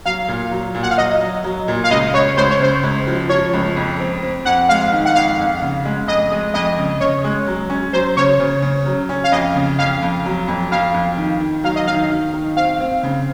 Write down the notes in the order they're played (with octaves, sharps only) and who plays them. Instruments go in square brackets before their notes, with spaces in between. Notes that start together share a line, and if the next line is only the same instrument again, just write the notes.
[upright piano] F#3 [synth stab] F5
[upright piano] A#2
F#3
A#2
[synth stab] F#5
F5
[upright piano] F#3 [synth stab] D#5
[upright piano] F#3
F#3
A#2
[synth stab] F5
[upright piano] C#2 [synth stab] D#5
[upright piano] C#2 [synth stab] C#5
[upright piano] C#2 [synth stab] C5
[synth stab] C#5
[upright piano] C#3 [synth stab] C5
[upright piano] C#2
F3
[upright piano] F3 [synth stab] C#5
[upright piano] C#2
F2
C4
C4
[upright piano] F2 [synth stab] F#5
[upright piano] G#3 [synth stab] F5
[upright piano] D#3
[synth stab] F#5
[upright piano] F2 [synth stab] F5
[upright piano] F2
C#3
G#3
[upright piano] F2 [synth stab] D#5
[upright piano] G#3
[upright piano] F2 [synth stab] D#5
[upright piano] C#3
[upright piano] C#3 [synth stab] C#5
[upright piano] G#3
F#3
C#4
[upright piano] F#3 [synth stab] C5
[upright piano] C#3 [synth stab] C#5
[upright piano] C#3
C#3
F#3
C#4
[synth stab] F5
[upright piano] F2 [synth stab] D#5
[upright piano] C#3
[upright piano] F2 [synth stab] F5
[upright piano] F2
F#3
F2
[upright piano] F2 [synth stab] F5
[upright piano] F2
D#3
D#3
[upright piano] F#3 [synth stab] F5
[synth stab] D#5
[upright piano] D#3 [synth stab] F5
[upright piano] D#3
D#3
[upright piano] C4 [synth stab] F5
[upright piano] C4
C#3